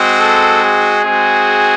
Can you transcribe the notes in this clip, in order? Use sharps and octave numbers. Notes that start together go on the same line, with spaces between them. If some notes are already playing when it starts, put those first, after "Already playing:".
Already playing: G#3 C4 F#4
A4
G#4
G#3 C4 F#4